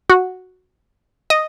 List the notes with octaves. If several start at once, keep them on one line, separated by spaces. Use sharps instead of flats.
F#4
D#5